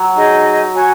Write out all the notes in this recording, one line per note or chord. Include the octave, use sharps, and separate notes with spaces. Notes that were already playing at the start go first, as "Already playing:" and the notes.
Already playing: F#3
D#4 G#4 D#5
F#4 C#5 G#5 C#6